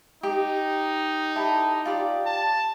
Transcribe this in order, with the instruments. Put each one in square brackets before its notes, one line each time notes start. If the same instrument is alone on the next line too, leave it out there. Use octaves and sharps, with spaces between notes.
[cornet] D#4 [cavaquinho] G4
[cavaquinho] E4 G4 A4
F4 G4 D5
[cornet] A5